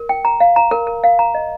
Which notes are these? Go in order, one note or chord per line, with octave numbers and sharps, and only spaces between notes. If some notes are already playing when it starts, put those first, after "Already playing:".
Already playing: A#4
G5
A#5
F5
A#5
A#4
A#4
F5
A#5
D#5